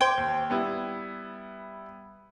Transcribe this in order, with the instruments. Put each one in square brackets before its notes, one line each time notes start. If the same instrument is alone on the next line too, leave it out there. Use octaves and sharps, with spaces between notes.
[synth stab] C5 D6 [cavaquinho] G5 [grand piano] G#6
[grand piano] D#2
G3 B3 E4